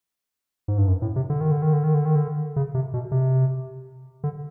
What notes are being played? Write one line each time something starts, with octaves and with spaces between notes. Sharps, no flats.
G#2
G2
F#2
A2
C3
D3
D#3
D3
D#3
D3
D#3
D3
D#3
D3
C#3
C3
B2
C3
D3